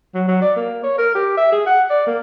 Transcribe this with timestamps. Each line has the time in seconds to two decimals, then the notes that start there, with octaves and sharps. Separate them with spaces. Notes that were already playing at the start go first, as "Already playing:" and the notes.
0.14 F#3
0.28 F#3
0.42 D5
0.56 A#3
0.84 C#5
0.98 A#4
1.15 G4
1.37 E5
1.52 G#4
1.66 F#5
1.90 D5
2.07 A#3